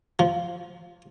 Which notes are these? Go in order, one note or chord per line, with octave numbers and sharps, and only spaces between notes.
F3